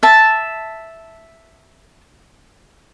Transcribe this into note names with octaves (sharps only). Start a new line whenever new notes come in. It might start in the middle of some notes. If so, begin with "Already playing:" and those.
E5 A5